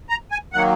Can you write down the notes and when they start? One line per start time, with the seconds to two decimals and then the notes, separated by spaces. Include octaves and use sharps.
0.09 A#5
0.31 G#5
0.53 D#3 F#3 A#3 F#5